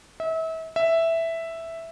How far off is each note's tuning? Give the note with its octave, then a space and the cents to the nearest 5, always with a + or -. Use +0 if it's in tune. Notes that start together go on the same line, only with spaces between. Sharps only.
E5 -35
E5 +0